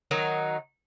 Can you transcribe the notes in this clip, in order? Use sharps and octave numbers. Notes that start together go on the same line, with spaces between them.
D#3 F#3 D#4 A#4